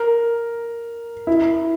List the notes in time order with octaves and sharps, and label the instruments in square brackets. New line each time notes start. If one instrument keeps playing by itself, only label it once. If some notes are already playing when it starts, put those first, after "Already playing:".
Already playing: [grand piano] A#4
E4